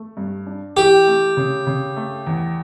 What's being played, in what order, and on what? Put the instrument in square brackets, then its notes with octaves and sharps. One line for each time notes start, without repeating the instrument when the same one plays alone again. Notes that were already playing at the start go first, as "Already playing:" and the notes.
Already playing: [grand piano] A3
G2
D4
[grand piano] E3 [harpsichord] G4
[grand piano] A3
C#3
C#3
A3
E2